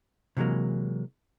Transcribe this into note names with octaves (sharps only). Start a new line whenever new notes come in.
C3 E3 F#3 G#3 A#3